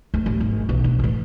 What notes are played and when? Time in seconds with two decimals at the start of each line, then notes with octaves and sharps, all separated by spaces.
0.14 D2
0.26 A1
0.40 G#1
0.69 B1 E3
0.84 D4
0.99 A2 E3